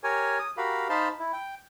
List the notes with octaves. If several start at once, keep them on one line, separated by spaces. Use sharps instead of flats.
G4 A#4 C#5 G#5
D#6
F#4 G4 A#4 F5 B5
D#4 C5 F5 A5 B5 C6
E4
G5